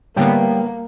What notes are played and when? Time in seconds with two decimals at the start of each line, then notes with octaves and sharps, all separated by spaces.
0.16 A2 D3 G3 A#3 B3 G5